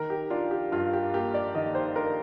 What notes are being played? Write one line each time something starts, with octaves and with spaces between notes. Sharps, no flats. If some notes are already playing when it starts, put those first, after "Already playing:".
Already playing: D#3 A#4
G4
D4 F4
G4
G2 F4
G4
A#3 G4
D5
D#3 D#5
C5
D4 A#4